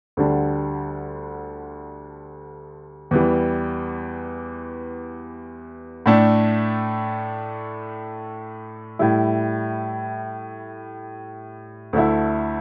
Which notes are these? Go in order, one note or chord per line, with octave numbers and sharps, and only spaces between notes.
D2 D3 G3 D4
E2 E3 G3
A2 A3 D4
A2 G3 E4
D2 D3 A3 E4